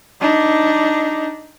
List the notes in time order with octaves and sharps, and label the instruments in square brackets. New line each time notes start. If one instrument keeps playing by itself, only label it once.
[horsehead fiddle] D4 D#4